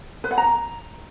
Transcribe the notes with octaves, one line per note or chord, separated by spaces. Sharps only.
B4
F#5
A#5